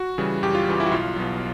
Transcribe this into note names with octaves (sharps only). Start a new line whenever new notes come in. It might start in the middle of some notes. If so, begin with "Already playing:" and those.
Already playing: F#4
C#3 E3 G3
F#2 G4
F4
C#3 E3 G3
E4
F#4
B1 F4
B2 F#3